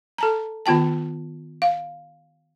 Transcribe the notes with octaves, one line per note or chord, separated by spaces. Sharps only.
A4 A5 A#5
D#3 B3 F4 G5 A5
F5